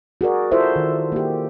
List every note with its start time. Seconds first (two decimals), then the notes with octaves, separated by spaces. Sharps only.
0.21 F#4 G#4 A#4 D5
0.51 E4 F4 A4 C5 D5 E5
0.76 D#3
1.12 A#3 G4